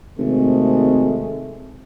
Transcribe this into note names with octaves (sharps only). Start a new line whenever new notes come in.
G#1 C3 G#3 A3